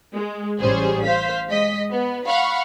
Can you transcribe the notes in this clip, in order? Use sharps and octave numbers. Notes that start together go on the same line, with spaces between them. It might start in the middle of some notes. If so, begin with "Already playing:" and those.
G#3
A1 G3 C#4 G#4 C5
C5 F5 B6
G#3 D#5 B6
B3
F5 F#5 B5 C#6